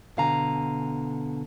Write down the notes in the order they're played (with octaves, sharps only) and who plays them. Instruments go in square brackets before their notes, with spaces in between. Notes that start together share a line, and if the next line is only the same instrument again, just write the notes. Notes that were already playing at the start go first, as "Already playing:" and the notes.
[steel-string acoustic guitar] B2 D3 F5 G#5 A#5